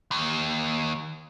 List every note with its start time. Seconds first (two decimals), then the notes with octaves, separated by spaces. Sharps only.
0.11 D#2